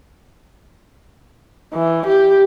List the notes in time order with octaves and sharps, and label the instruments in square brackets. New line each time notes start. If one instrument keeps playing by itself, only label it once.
[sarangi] E3
G4